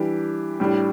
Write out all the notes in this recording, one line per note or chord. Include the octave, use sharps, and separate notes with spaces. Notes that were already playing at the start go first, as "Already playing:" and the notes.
Already playing: E3 G3 D4 G4
A2 G3 D4